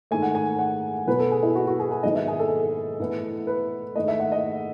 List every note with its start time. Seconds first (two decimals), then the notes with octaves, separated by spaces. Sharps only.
0.11 G#2 D#3 A3 G#5
0.22 F#5
0.35 G#5
0.59 F#5
1.07 B2 F#3 B3 B4
1.19 A4
1.32 G#4
1.43 E4
1.55 F#4
1.67 F#4
1.80 G#4
1.91 G#4
2.03 G#2 D#3 F#3 B3 D#5
2.16 E5
2.28 G#4
2.39 A4
3.00 A2 E3 B3
3.47 B4
3.95 G#2 D#3 A3 D#5
4.08 E5
4.20 F#5
4.32 D#5